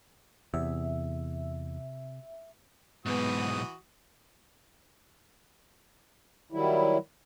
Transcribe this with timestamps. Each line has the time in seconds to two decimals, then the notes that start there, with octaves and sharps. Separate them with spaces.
0.54 E2 C3 E5
3.06 B1 G#2 E3 B3 F#4 D#6
6.52 D#3 F#3 G3 E4